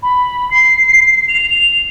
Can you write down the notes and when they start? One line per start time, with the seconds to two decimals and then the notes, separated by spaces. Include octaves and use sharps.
0.03 B5
0.51 C7
1.28 F7